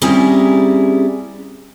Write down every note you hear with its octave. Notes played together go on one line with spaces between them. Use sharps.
G3 C4 C#4 E4 G#4 A#5